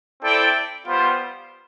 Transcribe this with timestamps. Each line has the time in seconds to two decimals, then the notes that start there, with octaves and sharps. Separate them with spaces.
0.21 C4 E4 A4 D5 G5
0.86 G3 B3 F4 C5